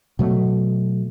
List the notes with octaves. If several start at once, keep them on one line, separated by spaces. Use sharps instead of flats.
B2 F#3 A3